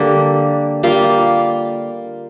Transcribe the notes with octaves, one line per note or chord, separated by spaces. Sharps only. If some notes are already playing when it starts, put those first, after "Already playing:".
Already playing: D3 G3 A#3
G3 A#3 F4